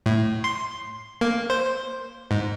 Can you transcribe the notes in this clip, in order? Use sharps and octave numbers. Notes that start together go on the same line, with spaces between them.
A2
C6
A#3
C5
G#2